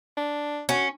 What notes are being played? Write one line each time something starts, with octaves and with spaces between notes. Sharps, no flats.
D4
C#4 F#4